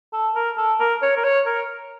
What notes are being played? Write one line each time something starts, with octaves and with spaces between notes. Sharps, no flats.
A4
A#4
A4
A#4
C#5
A#4
C#5
A#4